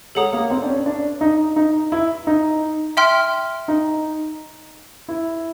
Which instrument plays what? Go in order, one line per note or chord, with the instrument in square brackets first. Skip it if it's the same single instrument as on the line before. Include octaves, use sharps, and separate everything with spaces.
[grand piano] G#3 [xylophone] A4 C#5 F#5 A#5 D#6
[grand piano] A#3
C4
D4
C#4
D4
D#4
D#4
E4
D#4
[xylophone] E5 G5 C6 F6
[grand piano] D#4
E4